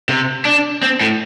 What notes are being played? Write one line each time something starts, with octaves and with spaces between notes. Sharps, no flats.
C3
D4
C4
A2